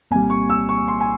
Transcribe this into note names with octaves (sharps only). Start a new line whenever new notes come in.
C2 A#2 G3 G#5
C#6
E6
C#6
C6
G#5